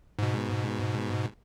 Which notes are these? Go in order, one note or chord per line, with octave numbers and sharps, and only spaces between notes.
G#2 B2